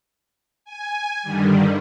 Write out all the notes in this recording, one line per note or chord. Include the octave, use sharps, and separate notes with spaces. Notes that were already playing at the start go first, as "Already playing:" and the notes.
G#5
G2 D3 D#3 G3